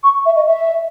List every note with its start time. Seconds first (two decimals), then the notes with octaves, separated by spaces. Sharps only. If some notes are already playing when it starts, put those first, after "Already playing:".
0.03 C#6
0.25 E5
0.35 D#5
0.47 E5